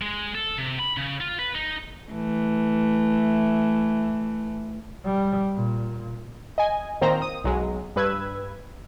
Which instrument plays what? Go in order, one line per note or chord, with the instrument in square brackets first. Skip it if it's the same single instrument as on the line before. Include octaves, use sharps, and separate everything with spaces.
[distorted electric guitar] G#3
A4
C3
B5
C#3
F4
B4
D#4
[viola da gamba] E3 A3
[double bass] G3
A#2
[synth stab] D#5 G#5
A#2 D#3 C4 C5 A#5 A#6
D#6
B1 F#3 G#3
G2 B4 E6 G#6